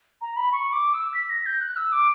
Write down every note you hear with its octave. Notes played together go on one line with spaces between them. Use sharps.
A#5
B5
C#6
D6
E6
B6
A#6
G6
F#6
E6
D6